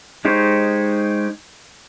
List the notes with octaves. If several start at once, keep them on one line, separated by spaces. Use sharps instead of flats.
G#3 D#4 G4 C5 C#5